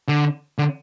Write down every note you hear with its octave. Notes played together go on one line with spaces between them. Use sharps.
D3
D3